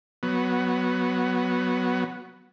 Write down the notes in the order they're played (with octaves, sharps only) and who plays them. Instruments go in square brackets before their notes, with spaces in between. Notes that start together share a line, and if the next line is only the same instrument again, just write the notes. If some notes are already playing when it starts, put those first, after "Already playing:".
[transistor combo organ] F#3 B3